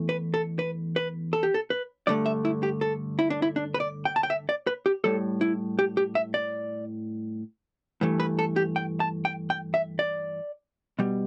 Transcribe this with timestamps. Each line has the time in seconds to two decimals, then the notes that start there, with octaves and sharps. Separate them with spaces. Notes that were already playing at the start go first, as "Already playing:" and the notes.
Already playing: E2 E3 A3
0.09 B4
0.34 A4
0.59 B4
0.96 B4
1.33 A4
1.43 G4
1.54 A4
1.70 B4
2.07 G2 D3 A3 D5
2.26 E5
2.45 E4
2.63 G4
2.81 A4
3.19 E4
3.30 D4
3.42 E4
3.56 D4
3.74 B4
3.80 D5
4.05 G5
4.16 A5
4.23 G5
4.30 E5
4.49 D5
4.67 B4
4.86 G4
5.04 A2 G3 A4
5.41 E4
5.79 G4
5.97 G4
6.15 E5
6.34 D5
8.01 G2 E3 A3
8.20 B4
8.39 A4
8.56 G4
8.76 G5
9.00 A5
9.25 G5
9.50 G5
9.74 E5
9.99 D5
10.99 B2 G3